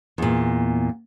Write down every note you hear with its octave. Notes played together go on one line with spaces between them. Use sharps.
E2 A#2